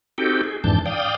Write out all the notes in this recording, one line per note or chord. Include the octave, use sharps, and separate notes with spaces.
C4 D#4 F#4 G4 A4 G5
G#4
F2 G#2 E3 D4 A5 G6
D5 F5 G5 D#6